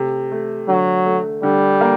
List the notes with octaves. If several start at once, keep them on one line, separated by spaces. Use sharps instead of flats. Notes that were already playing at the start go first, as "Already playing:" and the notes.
Already playing: C3 A3
A3
D3 F#3
A3
D3 G3
A#3